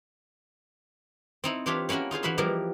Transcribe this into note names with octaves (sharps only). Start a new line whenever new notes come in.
C4 D#4 E4
E3 D4 F4 G4 C#5 E5
A#3 C#4 E4 F#4 A#4
D#4 F4 G#4 C5
E3 D#4 F#4 B4 E5 C6
E3 F3 G3 A#3 G4 A#4